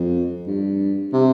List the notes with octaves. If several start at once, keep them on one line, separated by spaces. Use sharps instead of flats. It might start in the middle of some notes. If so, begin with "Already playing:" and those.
Already playing: F2
G2
C3